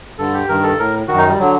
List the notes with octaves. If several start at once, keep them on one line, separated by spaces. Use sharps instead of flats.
G2 D3 A4
G4
G2 D#3 A#4
A4
A2 A#4
F#2 D#3 F#4
D#4
G3
D3 F#3